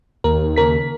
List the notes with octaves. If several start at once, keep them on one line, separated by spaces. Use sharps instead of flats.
D#2 A#4
C#3 A#4 B6